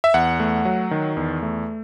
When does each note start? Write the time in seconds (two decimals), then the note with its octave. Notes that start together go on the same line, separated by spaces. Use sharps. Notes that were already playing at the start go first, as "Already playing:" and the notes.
0.04 E5
0.14 E2 F#5
0.40 A3
0.65 F#3
0.91 D#3
1.17 E2
1.43 A3